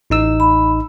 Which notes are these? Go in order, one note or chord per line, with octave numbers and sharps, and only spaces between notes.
A1 D#4 E6
B5